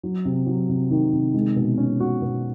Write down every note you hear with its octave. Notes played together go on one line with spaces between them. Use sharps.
F#3
C3
F#3
C3
D#3
C3
G#3
B2
C#4
F#4
B2